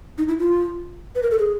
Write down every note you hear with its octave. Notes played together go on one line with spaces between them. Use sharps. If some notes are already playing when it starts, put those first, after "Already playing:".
D#4
E4
F4
B4
A#4
A4
G#4